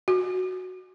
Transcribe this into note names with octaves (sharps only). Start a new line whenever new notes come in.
F#4